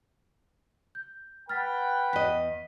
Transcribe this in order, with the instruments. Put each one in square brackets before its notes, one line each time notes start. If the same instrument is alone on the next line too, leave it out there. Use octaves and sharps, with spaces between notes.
[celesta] G6
[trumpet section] B4 F#5 G5 [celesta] F6 A6 B6
[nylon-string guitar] E2 D#5 [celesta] B6